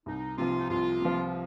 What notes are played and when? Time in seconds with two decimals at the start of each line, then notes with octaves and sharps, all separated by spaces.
0.06 C2 D#4
0.38 C3 F3 F4
0.59 D#4
0.70 C2 F4
1.01 C3 F3